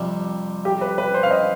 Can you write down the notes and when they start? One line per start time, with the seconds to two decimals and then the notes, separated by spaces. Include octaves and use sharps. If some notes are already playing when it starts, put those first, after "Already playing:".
Already playing: F2 C3 G3
0.65 G4
0.81 B4
0.98 B4
1.14 C5
1.23 F5
1.31 D#5